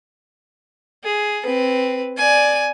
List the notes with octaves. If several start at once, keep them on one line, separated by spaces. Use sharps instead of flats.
G#4
C4 B4
D5 G#5